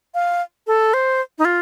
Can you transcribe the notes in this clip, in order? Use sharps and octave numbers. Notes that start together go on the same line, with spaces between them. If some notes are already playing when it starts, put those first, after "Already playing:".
F5
A4
C5
D#4
F4